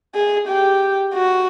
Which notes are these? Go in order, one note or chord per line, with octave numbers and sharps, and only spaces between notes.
G#4
G4
F#4